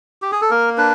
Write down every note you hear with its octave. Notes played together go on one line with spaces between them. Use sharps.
G4
G#4
A4
A#3 A#4
D4 B4